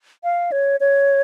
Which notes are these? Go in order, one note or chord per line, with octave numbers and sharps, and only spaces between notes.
F5
C#5
C#5